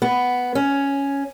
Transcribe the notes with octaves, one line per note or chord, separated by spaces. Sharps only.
B3
C#4